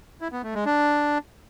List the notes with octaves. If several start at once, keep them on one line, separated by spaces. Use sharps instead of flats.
E4
B3
A3
G#3
D4